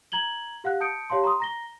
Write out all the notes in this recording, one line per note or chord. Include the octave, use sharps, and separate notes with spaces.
A#5 G#6 F#7 G7
G4 F5 F#5 F#6
A5 D#6 G6 C#7 D7
G4 C#5 F5 A5 C6
A#5 C6 C#6 D#6
A#5 A#6 G7